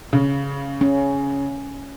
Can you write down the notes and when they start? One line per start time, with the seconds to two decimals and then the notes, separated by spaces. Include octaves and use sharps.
0.13 C#3
0.81 C#4